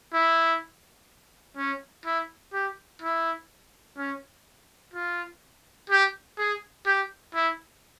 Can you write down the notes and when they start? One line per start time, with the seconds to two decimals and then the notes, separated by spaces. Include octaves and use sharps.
0.13 E4
1.57 C#4
2.05 E4
2.53 G4
3.02 E4
3.97 C#4
4.94 F4
5.90 G4
6.38 G#4
6.86 G4
7.34 E4